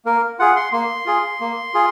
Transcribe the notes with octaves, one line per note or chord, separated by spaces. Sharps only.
A#3 A#4
F4 G#4 F#5
C6
A#3 C6
F4 G#4
A#3
F4 G#4